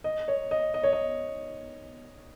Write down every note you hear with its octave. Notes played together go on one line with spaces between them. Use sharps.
D#5
C#5
D#5
D#5
C#5
D#5